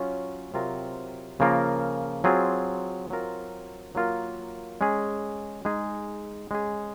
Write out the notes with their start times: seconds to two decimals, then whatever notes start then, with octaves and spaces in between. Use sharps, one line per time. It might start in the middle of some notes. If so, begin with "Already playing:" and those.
Already playing: F#3 C#4 F4
0.54 C3 F#3 C4 F4 A#4
1.40 C#3 F3 A#3 F4 A#4
2.24 F#3 C4 F4 G#4
3.10 F#3 C4 F4 A#4
3.95 F#3 A#3 F4 A#4
4.81 G#3 C#4 G#4
5.65 G#3 D#4 G#4
6.51 G#3 C#4 G#4